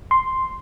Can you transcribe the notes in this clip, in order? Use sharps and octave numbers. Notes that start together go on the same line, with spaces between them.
C6